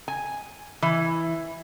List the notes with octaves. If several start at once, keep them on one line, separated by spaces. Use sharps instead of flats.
G#5
E3